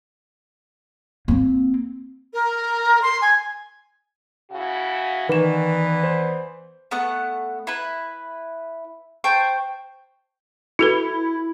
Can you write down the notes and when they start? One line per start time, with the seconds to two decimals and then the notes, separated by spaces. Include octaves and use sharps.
1.28 A#3 C4
2.33 A#4
3.02 C6
3.21 G#5
4.52 C#3 E4 F#4
5.29 D#3 E3 B3 B4 D5 E7
6.04 C5
6.91 A3 B3 F#5
7.67 E4 B4
9.24 C5 G5 A5 C#6
10.79 E4 F#4 A4 B4